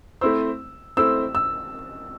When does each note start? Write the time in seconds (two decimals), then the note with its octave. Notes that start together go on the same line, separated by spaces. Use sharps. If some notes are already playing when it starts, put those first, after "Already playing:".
0.21 A3 C4 E4 C5 E6
0.97 A3 C4 E4 C5 E6
1.35 E6